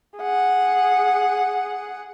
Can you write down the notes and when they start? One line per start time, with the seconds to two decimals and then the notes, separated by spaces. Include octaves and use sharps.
0.18 G#4 F#5